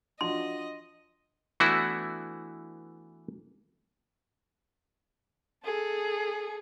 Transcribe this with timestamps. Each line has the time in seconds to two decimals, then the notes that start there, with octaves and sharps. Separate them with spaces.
0.21 F3 D4 F#4 D#5 C6
1.60 E3 A3 B3 D4 E4 F#4
5.64 G#4 A4